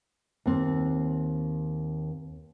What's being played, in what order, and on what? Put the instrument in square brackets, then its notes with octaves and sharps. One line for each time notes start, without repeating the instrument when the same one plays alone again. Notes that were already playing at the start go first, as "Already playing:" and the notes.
[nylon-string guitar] D#2 C4